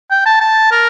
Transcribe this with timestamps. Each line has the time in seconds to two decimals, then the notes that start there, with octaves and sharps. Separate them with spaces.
0.11 G5
0.26 A5
0.41 A5
0.71 A#4